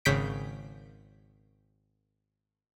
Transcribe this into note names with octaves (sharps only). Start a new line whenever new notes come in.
G#1 C#3 G6 B6 D7